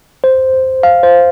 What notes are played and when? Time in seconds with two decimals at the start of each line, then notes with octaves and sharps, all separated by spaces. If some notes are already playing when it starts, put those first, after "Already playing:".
0.24 C5
0.83 F5
1.03 C5